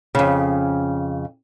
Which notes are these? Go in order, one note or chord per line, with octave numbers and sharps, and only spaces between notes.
F2 C#3